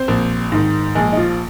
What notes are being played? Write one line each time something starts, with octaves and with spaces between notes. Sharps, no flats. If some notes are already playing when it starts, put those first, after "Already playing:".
Already playing: C4 C5
A#1
G#2 D#3
A#1 G#3 G#4
D#4
F3 F4